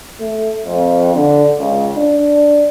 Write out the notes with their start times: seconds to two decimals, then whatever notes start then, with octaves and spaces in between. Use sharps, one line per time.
0.19 A3
0.65 F2
1.14 D3
1.59 C#2
1.96 D4